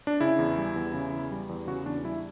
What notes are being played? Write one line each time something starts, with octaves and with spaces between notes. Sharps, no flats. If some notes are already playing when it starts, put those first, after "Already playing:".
D4
C#3 E4
E2
G3
E2
C#3
E2
G3
E2
C#3 F#4
E2 D4
G3 E4